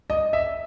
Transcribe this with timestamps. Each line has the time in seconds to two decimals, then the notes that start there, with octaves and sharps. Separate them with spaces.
0.10 D#5
0.33 E5